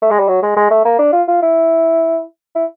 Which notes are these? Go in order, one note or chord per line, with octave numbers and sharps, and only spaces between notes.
A3
G#3
G3
F#3
G#3
G#3
A3
A#3
D4
F4
F4
E4
E4